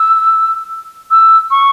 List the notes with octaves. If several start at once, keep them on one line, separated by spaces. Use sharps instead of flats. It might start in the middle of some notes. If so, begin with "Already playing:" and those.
Already playing: E6
E6
C#6